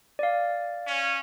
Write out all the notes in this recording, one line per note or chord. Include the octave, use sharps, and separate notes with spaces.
D5 F5
C#4